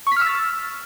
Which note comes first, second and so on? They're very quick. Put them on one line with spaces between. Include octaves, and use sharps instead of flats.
C#6 B6 F6 E6 A6